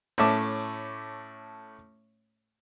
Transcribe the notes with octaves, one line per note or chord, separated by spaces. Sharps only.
A2 A3 C#4 E5 A5 D6